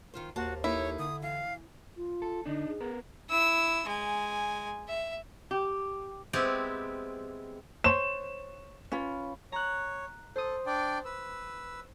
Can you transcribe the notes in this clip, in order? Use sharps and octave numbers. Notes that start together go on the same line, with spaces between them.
D#3 F4 C5
D#2 A#3 F#4 C5 A5
A#3 D#4 E4 A4 C#5
D3 D#6
E3 F5
F4
A4
D3 D4 D#4
G#4
B3 A#4
E4 E6
G#3 G#5
E5
G4
G#3 B3 C4 E4 G4
C5 C#5 E7
C#4 F4 B4
C#5 A#5 F#6
A4 C5 D#6
D4 D5 G5
B4 E6